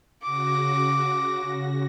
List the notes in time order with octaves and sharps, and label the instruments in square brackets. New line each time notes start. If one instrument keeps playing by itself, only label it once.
[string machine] C#3 F#4 A#6 [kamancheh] D6